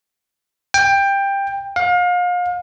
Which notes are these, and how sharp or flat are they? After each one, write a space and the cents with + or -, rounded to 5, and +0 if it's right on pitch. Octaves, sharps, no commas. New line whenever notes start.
G5 +15
F5 +35